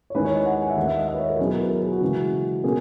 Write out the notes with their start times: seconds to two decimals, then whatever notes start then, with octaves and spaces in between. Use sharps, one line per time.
0.10 C#5
0.14 D#2 D#3 G#3 C#4 E4 B4
0.25 C#5
0.35 D#5
0.46 F#5
0.62 G#5
0.70 E5
0.76 D#2 D#3 G#3 F#5
0.88 E5
0.98 D#5
1.08 E5
1.13 B4
1.19 C#5
1.29 A#4
1.39 B2 F#3 C#4 E4 G#4
1.50 A#4
1.60 B4
1.70 A#4
1.81 G#4
1.92 F#4
2.01 C#3 E3 G#3
2.64 B2 A#3 C#4 G#4